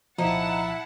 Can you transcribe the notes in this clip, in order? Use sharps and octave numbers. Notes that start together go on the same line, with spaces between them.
C2 A#2 F3 D#4 E4 F#5 A5